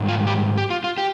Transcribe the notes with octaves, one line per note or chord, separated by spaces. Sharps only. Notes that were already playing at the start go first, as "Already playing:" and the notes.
Already playing: G#2 D#3 G3
F4
G4
G4
F4
F4
G4